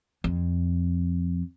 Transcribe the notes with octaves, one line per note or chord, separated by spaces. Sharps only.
F2